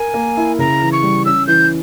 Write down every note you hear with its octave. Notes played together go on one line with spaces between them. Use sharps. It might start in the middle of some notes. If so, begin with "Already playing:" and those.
Already playing: A#4 G#5
A#3
E4
C#3 A#5
E3
C#6
G3
C#4 E6
E3 G6